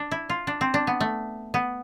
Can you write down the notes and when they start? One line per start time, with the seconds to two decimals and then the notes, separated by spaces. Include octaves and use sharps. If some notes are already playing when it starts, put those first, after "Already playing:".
Already playing: D4
0.11 E4
0.30 F4
0.47 D4
0.61 C4
0.74 D4
0.87 B3
1.00 A3
1.54 B3